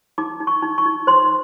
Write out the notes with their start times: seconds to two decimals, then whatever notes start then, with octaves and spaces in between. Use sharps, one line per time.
0.18 D#4 D6
0.40 D#4
0.47 C#6
0.62 D#4
0.78 C#6
0.86 D#4
1.07 C5 C6